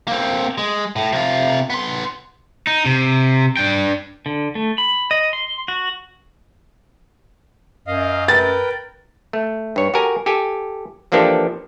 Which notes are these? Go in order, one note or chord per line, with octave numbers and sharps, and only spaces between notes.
A#3 C4
G#3
A2
C3 F4
B3 C6
D#4
C3
D4 G5
D3
A3
B5
D#5
C6
F#4
F#2 D#5 F5
A#4 B4 G5 A6
A3
G2 C#5
F#4 G4 A4 A#4 G#5
G4 A4 G#5
E3 F3 A#3 D4 G4 A4